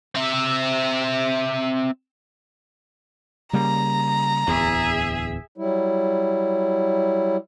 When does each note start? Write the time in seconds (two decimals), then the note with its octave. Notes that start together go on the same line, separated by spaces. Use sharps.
0.15 C4 E5
3.53 C#3 G3 A#3 A#5
4.48 D1 G#1 E2 G#4 E5
5.58 F#3 G3 E4